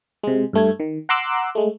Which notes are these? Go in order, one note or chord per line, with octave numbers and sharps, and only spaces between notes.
C3 G#3
G2 A3 G#6
D#3
F#5 A#5 C6 D6 E6 F#6
G#3 A3